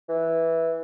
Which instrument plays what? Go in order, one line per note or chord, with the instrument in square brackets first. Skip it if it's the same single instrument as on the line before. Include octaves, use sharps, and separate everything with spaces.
[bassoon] E3